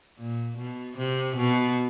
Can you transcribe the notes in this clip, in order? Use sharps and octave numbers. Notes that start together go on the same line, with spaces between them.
A#2
B2
C3
B2